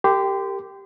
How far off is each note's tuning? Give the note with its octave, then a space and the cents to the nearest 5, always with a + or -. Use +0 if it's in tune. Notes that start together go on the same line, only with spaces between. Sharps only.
G4 +0 A#4 -35 C6 -30